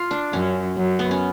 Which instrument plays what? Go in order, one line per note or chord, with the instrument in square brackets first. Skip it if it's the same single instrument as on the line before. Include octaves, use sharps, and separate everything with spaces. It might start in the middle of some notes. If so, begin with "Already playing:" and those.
Already playing: [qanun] F4
D4
[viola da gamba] F#2 [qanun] C#4
[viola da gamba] F#2
[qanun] B3
C#4